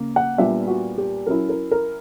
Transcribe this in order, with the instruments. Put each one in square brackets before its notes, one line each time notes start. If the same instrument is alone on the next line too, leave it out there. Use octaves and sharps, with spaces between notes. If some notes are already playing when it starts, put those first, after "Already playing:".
Already playing: [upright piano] C#3 A#3
F#5
A#2 G3 B3 D4 E5
F#4
G4
F#3 C#4 E4 A#4
A#4
A#4